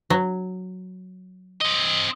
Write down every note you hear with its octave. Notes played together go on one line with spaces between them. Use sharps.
F#3
C4 D#5